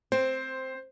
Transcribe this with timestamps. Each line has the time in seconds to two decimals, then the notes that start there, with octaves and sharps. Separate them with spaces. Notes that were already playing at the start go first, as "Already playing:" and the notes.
0.12 C4 C5